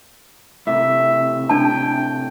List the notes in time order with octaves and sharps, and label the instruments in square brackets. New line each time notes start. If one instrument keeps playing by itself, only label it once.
[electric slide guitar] A2 C3 [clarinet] E5
[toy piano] D4 A5 [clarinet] G5